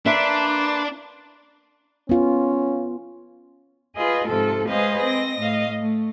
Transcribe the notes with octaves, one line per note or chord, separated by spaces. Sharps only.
A#3 D4 B4 E5 C6
B3 C#4 F4
F4 G#4 B4 D#5
G#2 C3 F3 A4
G#3 G#4 B4 C5 D#5 F5
C4 D#5 A#6
A2 D#5 F5
A3